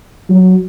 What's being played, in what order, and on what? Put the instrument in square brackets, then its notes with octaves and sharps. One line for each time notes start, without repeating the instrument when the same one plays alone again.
[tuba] F#3